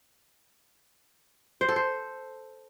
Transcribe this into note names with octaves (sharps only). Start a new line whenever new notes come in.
C5
A4
C5